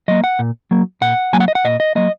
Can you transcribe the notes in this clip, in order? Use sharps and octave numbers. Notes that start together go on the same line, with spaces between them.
F#3 A#3 D#5
F#5
A#2
F#3 A#3
A#2 F#5
F#3 A#3 G#5
F#5
D#5
F#5
A#2 D#5
D#5
F#3 A#3 D#5